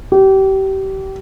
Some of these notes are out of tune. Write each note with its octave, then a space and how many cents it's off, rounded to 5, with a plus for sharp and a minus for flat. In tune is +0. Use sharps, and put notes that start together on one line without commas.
G4 -30